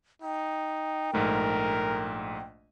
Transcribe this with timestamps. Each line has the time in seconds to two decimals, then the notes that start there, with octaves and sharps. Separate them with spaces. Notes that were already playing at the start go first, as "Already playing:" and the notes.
0.22 D#4 G5
1.13 A#1 G#2 A3 A#4